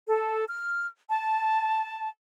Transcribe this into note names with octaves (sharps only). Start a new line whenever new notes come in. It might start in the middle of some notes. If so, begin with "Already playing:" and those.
A4
F6
A5